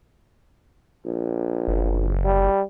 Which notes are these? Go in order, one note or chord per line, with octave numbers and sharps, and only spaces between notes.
A#1
F#1
G3